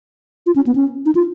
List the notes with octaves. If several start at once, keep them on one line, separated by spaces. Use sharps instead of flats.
F4
C#4
B3
C#4
D#4
F4